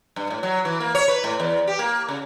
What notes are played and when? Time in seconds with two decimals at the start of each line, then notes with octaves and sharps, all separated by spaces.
0.16 G2
0.30 A2
0.43 F#3
0.65 E3
0.80 A#3
0.95 C#5
1.08 B4
1.24 A2
1.40 E2
1.68 G4
1.79 A#3
2.09 C#3